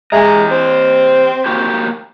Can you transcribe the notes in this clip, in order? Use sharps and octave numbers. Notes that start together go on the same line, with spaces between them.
G#3 G4 D#5 E5 G#5 A#5
C4 C5
A#3 F#4 G4